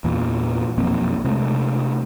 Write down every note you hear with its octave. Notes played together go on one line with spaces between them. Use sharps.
E2 A#2 E3
B1 F2 A#3 C4
C3 G#3 A3